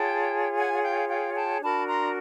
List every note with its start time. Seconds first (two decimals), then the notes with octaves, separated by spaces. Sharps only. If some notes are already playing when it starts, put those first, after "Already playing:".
Already playing: F4 G#4 C#5 G5 A5
0.58 F#5 G#5
0.74 F#5
0.83 F5 G5
1.09 F5 G5
1.35 G5 A5
1.61 D4 F#4 A#4 A5 B5
1.87 A#5 C6